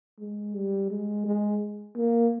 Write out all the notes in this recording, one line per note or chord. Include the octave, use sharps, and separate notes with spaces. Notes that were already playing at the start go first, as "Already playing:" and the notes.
G#3
G3
G#3
G#3
A#3